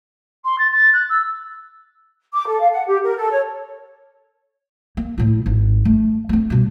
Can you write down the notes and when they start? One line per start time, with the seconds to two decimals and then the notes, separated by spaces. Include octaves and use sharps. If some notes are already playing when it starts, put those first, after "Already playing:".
0.44 C6
0.58 A6
0.72 A6
0.93 F#6
1.09 E6
2.33 D6
2.47 A4
2.60 F5
2.72 F#5
2.87 G4
3.03 A#4
3.17 A4
3.30 C#5
4.97 A#3
5.18 A2 E4
5.46 G#1
5.85 A3
6.29 A3 C4
6.50 G2 B2